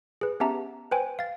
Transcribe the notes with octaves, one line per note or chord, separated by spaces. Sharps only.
G#4 B4
B3 C#4 G4 E5 A5 A#5
B4 C5 G5 G#5
F5 A6